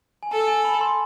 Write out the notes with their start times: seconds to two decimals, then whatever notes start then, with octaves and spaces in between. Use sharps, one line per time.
0.23 G#5
0.31 A4 A5
0.48 G#5
0.64 B5
0.81 C6